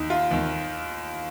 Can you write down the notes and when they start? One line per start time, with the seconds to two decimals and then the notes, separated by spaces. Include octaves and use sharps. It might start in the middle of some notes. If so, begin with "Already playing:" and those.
Already playing: D#2 D#4
0.10 F4
0.31 D#2 D#3